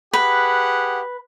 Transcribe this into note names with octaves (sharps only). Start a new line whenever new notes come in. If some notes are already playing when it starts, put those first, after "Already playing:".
G4 G#4 B4 F#5